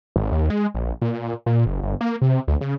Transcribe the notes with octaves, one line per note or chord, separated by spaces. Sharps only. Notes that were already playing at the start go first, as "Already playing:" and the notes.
G#1
D#2
G#3
A#1
A#2
A#2
F#1
G1
A#3
C3
D2
C#3